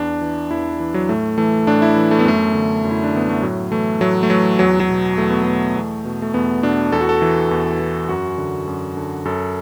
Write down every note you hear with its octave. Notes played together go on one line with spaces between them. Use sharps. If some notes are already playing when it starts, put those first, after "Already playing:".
Already playing: E2 D4
E3
E2 E4
E3
F#3
A2 A3
E3 A3
A2 D4
E4
E3
A3
B3
F#2 A3
D3
F#2
E4
D4
D3 B3
A3
A2 F#3
E3 A3
A2 F#3
A3
E3 F#3
E2 F#3
F#3
B2
E2 A3
B3
B2 A3
E2
B2
A3
E2 B3
B2 D4
E2 A4
F#4
A4
E3
E2
E3
F#2 F#4
D3
F#2
D3
F#2 A4